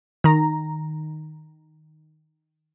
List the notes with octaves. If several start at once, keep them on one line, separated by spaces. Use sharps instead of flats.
D#3 A#5